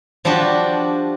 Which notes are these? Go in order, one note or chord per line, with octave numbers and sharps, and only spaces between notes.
F3 G3 D4 F#4 G4